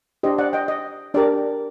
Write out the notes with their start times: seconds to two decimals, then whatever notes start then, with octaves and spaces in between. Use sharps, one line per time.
0.23 D4 G4 C5 D#5
0.38 D5 F#5
0.53 D#5 G5
0.68 D#5
1.14 D4 G4 A#4 D5